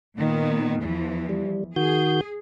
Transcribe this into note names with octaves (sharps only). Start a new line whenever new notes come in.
A#2 D#3 B3
E2 E3 F3
G3
D#3 F#4 G#4 G6